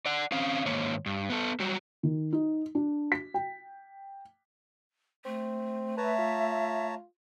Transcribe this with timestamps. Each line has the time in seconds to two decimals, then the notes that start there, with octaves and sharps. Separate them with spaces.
0.06 D5 F#5
0.32 C4 C#4 F5
0.65 G#2 D#3 A#3 C#5
1.06 G2
1.30 B3 A4
1.60 F#3 G3 F#4
2.03 D#3
2.33 D#4
2.75 D4
3.12 B6
3.34 G5
5.25 A3 C4
5.98 B4 C#5 E5 A5 A#5
6.19 F4